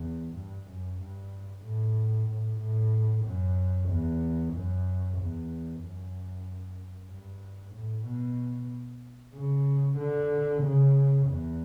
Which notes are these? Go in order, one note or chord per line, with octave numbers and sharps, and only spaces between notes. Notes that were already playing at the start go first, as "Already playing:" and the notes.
Already playing: E2
G2
F#2
G2
A2
A2
A2
F#2
E2
F#2
E2
F#2
G2
A2
B2
C#3
D3
C#3
E2